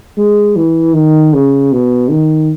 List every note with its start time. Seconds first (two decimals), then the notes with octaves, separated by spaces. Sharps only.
0.17 G#3
0.56 E3
0.94 D#3
1.33 C#3
1.72 B2
2.10 D#3